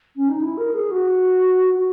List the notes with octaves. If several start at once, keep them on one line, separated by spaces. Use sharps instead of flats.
C#4
D#4
E4
A#4
G#4
F#4
F#4